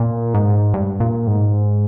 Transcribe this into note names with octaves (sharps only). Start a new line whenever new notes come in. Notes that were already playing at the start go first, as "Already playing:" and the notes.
Already playing: A#2
G#2
G2
A#2
G#2